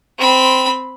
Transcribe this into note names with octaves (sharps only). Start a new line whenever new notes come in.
C4 B5